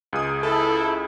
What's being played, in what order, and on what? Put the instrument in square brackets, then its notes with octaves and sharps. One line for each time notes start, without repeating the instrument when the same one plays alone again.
[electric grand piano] C#2 G#4 D#6
[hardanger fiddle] E4 [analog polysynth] A4